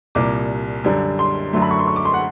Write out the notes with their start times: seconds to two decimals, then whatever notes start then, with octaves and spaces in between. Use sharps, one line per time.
0.15 C2 A#2 G3 D6
0.84 F#2 D3 G3
1.19 C6
1.53 F#2 D3 F#3 A3 C6
1.62 B5
1.71 C#6
1.79 C6
1.88 C#6
1.96 D6
2.05 C6
2.14 F#5